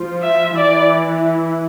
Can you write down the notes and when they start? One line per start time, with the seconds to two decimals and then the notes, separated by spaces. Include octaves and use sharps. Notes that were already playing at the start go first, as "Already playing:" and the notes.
Already playing: F3 F4
0.23 E5
0.56 E3 E4 D5